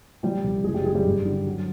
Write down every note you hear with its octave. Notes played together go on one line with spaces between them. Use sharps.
F3 G3 G4
C2
F#1 G#3 G#4
G3 G4
F#1 G#3 G#4
G3 G4
G2
D3
F#3